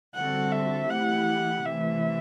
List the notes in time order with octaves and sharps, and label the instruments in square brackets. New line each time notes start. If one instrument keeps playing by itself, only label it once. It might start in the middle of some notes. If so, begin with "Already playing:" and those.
[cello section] D3 G3 C4 F#4 A4 [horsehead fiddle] F#5
[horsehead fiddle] E5
[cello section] E3 A3 E4 G4 [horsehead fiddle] F#5
[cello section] C3 E3 A3 [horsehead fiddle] E5